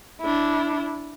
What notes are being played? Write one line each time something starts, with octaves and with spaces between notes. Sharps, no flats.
D4 E4